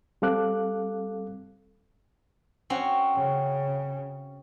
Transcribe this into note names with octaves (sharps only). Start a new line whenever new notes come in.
G3 C4 A4 F5 D6 F#6
C4 C#4 F#4
C#3